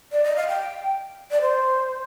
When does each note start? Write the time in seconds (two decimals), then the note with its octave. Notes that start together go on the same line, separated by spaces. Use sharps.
0.12 D5
0.24 D#5
0.36 F5
0.48 G5
1.31 D5
1.41 C5